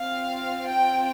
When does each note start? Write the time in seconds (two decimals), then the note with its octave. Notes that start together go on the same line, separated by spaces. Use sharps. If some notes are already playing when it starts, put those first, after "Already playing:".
Already playing: C4 F4 F5
0.67 G5